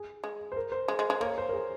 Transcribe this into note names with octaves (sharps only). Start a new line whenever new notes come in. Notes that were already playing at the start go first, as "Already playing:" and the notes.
Already playing: G#4
G#3
C5
A#4
C5
G#3
G#3
G#3
A#3 C#5
C5
A#4
G#4